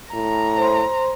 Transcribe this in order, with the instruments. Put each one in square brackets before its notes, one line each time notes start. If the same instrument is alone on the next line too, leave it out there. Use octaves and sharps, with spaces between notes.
[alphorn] A2 [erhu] A#5
[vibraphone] C5 C6